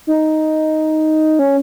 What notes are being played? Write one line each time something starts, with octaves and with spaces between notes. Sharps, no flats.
D#4
C#4